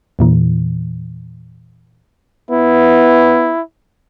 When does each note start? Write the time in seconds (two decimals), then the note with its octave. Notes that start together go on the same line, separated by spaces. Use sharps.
0.19 E2 A#2 E3
2.51 B3 E4